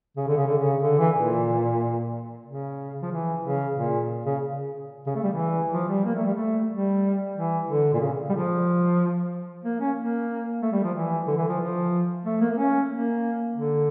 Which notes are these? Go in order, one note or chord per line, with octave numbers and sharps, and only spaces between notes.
C#3
D3
C#3
D3
C#3
D3
E3
A#2
C#3
F3
E3
C#3
A#2
C#3
C#3
A3
G3
E3
F3
G3
A#3
A3
G3
A3
G3
E3
D3
A#2
C#3
G3
F3
A#3
C#4
A#3
A3
G3
F3
E3
D3
E3
F3
F3
A3
A#3
A#3
C#4
A#3
D3